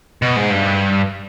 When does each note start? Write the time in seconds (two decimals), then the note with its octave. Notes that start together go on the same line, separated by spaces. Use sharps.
0.22 B2
0.36 G#2
0.50 G2